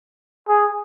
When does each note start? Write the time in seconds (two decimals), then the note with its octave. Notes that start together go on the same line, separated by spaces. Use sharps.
0.48 G#4